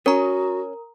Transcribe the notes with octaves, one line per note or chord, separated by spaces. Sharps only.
C#4 F#4 A#4 A#5